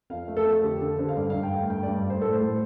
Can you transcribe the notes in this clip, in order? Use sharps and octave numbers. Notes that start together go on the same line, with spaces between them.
F2 F5
A3
A4
F2
D3 G4
D3 A4
D3 C5
F5
G2 D5
F5
G2
G5
A3 F5
G2 G5
D5
G2
D5
A3 C5
A2 A4
C5
A2